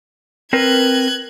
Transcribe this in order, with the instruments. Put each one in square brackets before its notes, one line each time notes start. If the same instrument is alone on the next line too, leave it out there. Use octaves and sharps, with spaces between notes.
[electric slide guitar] C4 A#4 B4 [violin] F#6 G#6